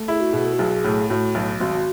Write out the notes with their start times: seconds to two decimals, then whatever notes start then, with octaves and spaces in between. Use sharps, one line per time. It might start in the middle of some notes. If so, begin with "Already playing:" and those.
Already playing: A3
0.08 E4 G#4
0.21 F#4
0.33 B2 G#4
0.46 A4
0.54 F#4
0.59 B1 G#4
0.84 A2
1.10 A2 F#4
1.35 B1
1.60 G#1 F#4